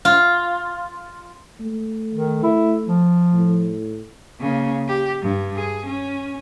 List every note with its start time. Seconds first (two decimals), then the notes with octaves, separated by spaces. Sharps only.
0.05 F4
1.60 A3
2.14 D#3
2.43 E4
2.87 F3
3.33 A2
4.40 C#3 A#3
4.89 G4
5.22 G2
5.56 G#4
5.86 C#4